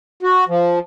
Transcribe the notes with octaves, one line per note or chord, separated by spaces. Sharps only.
F#4
F3